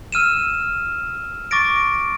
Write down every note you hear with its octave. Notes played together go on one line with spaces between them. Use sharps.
E6 F6 D#7 E7
C#6 D6 A6 A#6 D7